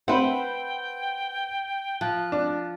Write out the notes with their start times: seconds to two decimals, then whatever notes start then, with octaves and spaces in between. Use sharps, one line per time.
0.08 C4 B4 E5 F#5 G5 B5
2.01 F3 F#6
2.32 D4